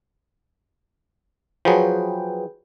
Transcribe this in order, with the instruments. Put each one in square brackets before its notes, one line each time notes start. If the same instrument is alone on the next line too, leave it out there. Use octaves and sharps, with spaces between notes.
[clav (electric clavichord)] F3 F#3 [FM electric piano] G#4 B4 G5